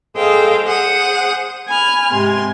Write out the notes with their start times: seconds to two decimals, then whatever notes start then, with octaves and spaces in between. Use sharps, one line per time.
0.17 G#4 A4 C5 D#5 F5 G5
0.65 G#4 C5 F#5 D#6
1.68 G#5 B5 F6
2.11 G#2 C3 G#5 C6